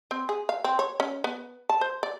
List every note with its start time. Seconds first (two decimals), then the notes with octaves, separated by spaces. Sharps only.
0.11 C4
0.29 G#4
0.49 F5
0.64 C4
0.79 C#5
1.00 C#4
1.24 B3
1.69 A5
1.81 C5
2.03 D5